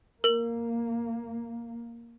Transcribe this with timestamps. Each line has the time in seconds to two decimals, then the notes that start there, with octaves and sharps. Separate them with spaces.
0.24 A#3 A#4 F#7